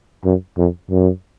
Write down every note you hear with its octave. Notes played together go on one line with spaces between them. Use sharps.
F#2
F2
F#2